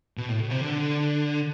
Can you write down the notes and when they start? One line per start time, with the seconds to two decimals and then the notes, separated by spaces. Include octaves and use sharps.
0.17 B2
0.28 A2
0.40 B2
0.50 C3
0.61 D3